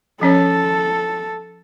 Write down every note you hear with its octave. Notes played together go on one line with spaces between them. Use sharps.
F3 C#4 A4 C#5